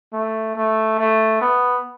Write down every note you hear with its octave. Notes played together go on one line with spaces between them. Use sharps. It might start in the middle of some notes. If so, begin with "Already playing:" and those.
A3
A3
A3
B3